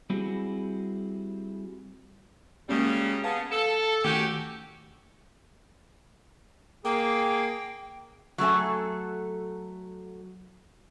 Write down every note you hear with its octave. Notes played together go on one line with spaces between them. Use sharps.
G3 C4 E4 F#4 G#4
F#2 C#3 G3 G#3 A#3 C#4
C#3 B3 F5 A5
A4
D#3 A3 C#4 F#4 G4
A#3 G#4 G5
F#3 A3 A4 G#5